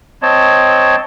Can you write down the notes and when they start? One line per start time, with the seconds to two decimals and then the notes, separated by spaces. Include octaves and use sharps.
0.22 C4 C#5 D#5 A5